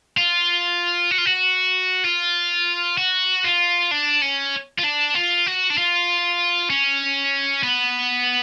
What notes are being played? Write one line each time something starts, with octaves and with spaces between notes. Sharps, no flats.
F4
F#4
F4
F#4
F4
F#4
F4
D4
C#4
F4
D4
F4
F#4
D4
F4
C#4
B3